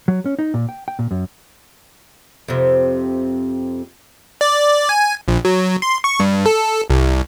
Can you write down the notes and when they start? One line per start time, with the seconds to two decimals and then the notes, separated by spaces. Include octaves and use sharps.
0.08 F#3
0.26 C#4
0.39 D#4
0.54 A#2
0.69 G5
0.88 G5
0.99 A#2
1.11 F#2
2.48 F2 C3
4.41 D5
4.89 G#5
5.28 A#1
5.45 F#3
5.82 C6
6.04 C#6
6.20 G2
6.46 A4
6.90 C2